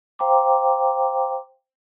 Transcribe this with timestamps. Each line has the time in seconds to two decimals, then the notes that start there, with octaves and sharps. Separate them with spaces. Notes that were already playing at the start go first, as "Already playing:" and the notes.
0.19 C5 F5 G5 A#5 C6 D6